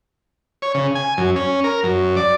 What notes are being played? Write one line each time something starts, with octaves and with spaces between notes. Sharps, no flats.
C#5
C#3
G#5
F#2
C#4
A#4
F#2
D5